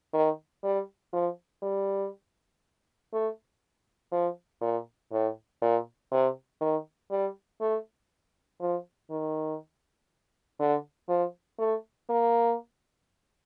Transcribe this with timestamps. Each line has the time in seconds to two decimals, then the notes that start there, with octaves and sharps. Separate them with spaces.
0.14 D#3
0.64 G3
1.13 F3
1.63 G3
3.13 A3
4.12 F3
4.61 A#2
5.12 A2
5.62 A#2
6.12 C3
6.61 D#3
7.11 G3
7.61 A3
8.61 F3
9.11 D#3
10.60 D3
11.09 F3
11.59 A3
12.09 A#3